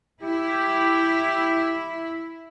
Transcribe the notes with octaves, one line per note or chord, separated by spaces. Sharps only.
E4 G4